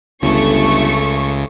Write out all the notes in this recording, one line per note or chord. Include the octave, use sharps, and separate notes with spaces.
G1 C#2 C#3 A3 C#6